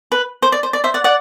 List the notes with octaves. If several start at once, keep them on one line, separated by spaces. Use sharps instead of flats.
B4
C5
D5
C5
D5
C5 E5
D5 F#5
D5 F#5